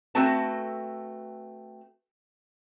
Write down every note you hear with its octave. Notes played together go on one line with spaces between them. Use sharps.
A3 C4 F#4 B4 A5